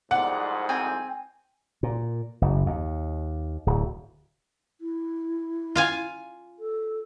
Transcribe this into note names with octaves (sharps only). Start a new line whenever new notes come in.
C2 F2 G#2 D5 F#5
C4 G5 G#5
A#2
F#1
D#2
D1
E4
F4 F5 G#5
A4